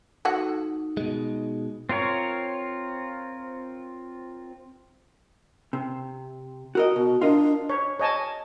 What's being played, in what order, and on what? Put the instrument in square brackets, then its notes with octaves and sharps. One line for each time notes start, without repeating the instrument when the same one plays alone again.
[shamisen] A3 F#4 F#5 [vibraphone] D#4
[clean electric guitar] B2 G#3
[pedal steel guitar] C4 F4 A#4 C#5
[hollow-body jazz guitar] C3
F#4 A#4 D#5
[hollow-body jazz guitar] B2 [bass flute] F#4
[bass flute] D4 [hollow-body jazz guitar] F4 A#4 D#5
[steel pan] C#5
C#5 D#5 G#5 A5